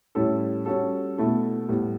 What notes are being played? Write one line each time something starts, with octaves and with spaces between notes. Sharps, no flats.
A2 G3 C#4 E4 A4
G3 C#4 F#4 A4
B2 A3 E4 A4
A2 G3 B3